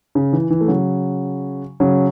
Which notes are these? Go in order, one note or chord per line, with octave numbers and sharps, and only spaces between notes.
C#3
E3
E3
A3
C#3 F#3
C#3 F#3